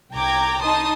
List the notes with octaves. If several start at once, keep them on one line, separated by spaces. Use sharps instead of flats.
C2 G5 A#5 D6 G#6
D#4 A5 C6 D#6